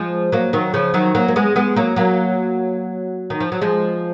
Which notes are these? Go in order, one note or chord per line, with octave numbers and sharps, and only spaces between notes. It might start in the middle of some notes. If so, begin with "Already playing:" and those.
Already playing: F3 G#3
F#3 A#3
D#3 F#3
C#3 F3
D#3 F#3
F#3 A#3
A#3
G#3 B3
G#3 B3
F#3 A#3
F#3 A#3
D#3
F3
F#3
F3 G#3